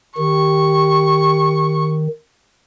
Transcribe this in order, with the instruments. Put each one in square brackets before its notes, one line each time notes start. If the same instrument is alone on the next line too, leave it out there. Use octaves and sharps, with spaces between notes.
[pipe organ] D#3 [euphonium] G4 [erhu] C#6